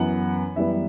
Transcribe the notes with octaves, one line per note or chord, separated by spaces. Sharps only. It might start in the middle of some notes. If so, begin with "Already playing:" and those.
Already playing: F#2 E3 B3 F#5
F#2 E3 G3 B3 E5